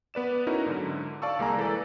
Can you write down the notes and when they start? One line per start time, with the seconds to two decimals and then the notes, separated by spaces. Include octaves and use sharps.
0.14 B3 B4 D5 E7
0.47 C#4 D#4 E4 F#4 A#4
0.66 G#2 D3 F#3
1.22 D5 F5 A5 C#6 E6
1.39 C2 G#3 A#3 G#4 G#5 A#5
1.57 E3 A4 B4 D5